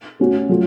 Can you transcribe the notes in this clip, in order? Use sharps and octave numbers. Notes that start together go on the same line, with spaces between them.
A3 C#4 F#4
F#3 A3 F4